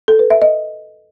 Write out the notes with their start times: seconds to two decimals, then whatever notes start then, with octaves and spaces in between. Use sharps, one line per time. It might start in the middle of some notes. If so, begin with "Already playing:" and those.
0.08 A4
0.19 B4
0.30 E5
0.42 D#5